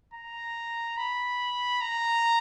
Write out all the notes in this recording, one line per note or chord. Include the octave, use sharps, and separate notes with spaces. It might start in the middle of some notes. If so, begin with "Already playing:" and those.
A#5
B5
A#5